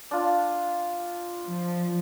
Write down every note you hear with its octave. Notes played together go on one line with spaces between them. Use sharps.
D4 F4
F3